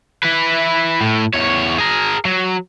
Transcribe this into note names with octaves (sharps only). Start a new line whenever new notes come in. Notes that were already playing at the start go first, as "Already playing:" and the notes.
E4 B4
A2
E2 C#5
G#4 A#4
F#3